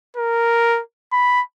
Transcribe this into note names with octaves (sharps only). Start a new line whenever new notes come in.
A#4
B5